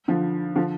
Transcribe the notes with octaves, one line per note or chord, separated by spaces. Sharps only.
D3 F3
D3 F3